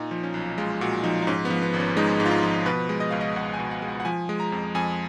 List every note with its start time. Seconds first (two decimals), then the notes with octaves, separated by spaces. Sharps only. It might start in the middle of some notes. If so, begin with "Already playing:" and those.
Already playing: A#2 D#4
0.11 F3
0.23 C#4
0.34 B1
0.58 G#3 F4
0.81 A#2 F#4
1.04 F3 D#4
1.22 D#4
1.27 G#2 C#4
1.45 B3
1.50 F3
1.62 B3
1.74 G#1
1.80 C#4
1.97 G#3 D#4
2.20 G#2
2.26 F4
2.31 D#4
2.43 F3
2.66 B2 B4
2.89 G#3
3.00 D#5
3.11 C#2 F5
3.21 D#5
3.36 C#2 F#5
3.53 G#5
3.59 B2
3.71 F#5
3.82 G#3
3.88 F#5
4.00 F#5
4.05 F3 G#5
4.29 G#3
4.40 A#5
4.52 F2
4.75 F2 G#5